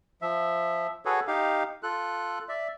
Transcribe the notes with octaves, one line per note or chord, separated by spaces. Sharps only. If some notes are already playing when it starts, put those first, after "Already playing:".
F3 E5
F#4 G#4 A4 B4 C#5
D#4 G4 F5
F4 A4 F#6
D5 E5